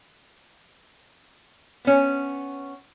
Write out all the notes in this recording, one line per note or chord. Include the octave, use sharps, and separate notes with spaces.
B3 C#4